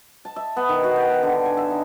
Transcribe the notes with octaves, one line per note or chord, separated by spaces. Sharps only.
A5
E5
B3
D#3
F#4
G5
D3
G#5
E5
D#4